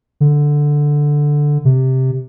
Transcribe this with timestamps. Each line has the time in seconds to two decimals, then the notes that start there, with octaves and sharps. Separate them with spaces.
0.21 D3
1.65 C3